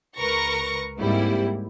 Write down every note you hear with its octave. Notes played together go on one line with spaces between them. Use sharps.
C#2 A#4 B4 C#6 A#6
G#2 G3 A#3 C4 E4